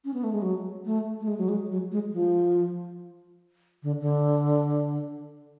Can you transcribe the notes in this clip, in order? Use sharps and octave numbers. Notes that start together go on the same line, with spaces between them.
C#4
B3
A3
G#3
F#3
A3
A3
G#3
F#3
G#3
F#3
G#3
F3
D3
D3